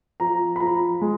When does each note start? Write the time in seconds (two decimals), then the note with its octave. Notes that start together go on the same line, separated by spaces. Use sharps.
0.20 F3 A#5
0.56 B5
0.60 F3 A#5
1.01 G#3